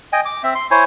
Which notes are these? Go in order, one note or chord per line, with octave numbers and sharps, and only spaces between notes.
D#5 G5 G#5
D6
C4 E5
C6
E4 C5 C#5 G#5